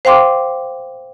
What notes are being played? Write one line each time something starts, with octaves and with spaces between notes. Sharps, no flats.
C5 F5 G5 C6 D6